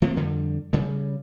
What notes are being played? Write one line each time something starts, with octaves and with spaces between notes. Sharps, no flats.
F3 A3 A#3 C4
F2 D3 G3
C#3 G3